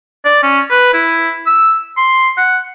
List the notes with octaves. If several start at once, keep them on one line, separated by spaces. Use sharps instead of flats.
D5
C#4
B4
E4
E6
C6
F#5